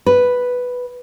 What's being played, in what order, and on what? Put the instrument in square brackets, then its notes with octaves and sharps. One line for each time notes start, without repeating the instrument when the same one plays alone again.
[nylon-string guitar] B4